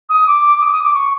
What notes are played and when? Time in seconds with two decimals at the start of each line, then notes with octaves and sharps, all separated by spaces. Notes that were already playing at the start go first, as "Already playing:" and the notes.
0.09 D#6
0.27 D6
0.61 D#6
0.66 D6
0.72 D#6
0.83 D6
0.94 C#6